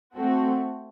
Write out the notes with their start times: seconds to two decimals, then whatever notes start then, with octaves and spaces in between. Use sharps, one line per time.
0.15 A3 C4 F#4 A4